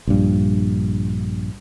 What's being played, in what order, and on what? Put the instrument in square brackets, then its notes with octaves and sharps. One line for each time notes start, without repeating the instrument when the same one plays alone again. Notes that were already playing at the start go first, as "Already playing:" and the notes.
[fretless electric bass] A#1 G2